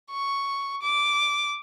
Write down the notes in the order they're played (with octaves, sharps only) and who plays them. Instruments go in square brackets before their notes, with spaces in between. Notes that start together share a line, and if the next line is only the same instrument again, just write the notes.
[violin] C#6
D6